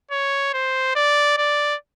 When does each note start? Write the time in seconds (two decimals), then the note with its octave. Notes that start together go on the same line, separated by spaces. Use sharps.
0.11 C#5
0.53 C5
0.95 D5
1.38 D5